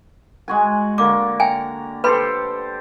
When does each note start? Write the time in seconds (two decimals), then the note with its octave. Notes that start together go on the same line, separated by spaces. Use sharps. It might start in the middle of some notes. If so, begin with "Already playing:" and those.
0.48 G#3 F#4 G#5
0.98 D3 A#3 D6
1.40 G5 G#5 A#5
2.04 G4 A4 B4 C5 B5 C6